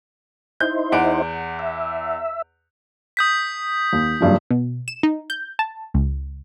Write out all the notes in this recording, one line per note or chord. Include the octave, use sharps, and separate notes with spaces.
D#4 E4 C5 G6
E2 F#5 D7
E5
D#6 G6 B6
D#2
F#1 G2 F3
B2
E7
D#4
G6
A5
C#2